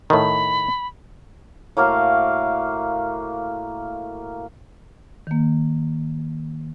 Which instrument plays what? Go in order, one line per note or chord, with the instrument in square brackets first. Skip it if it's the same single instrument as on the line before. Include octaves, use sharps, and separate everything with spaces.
[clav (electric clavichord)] A2 D#3 [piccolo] B5
[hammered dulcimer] A2 A#3 F#4 F5
[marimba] D#3 A#3